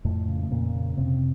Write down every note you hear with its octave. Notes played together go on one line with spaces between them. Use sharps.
F2 A2 A3
C#3
A3
F2 A#2 A#3
C#3
F2 C3 C4